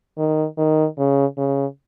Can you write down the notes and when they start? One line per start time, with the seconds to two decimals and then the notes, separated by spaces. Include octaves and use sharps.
0.18 D#3
0.58 D#3
0.97 C#3
1.38 C#3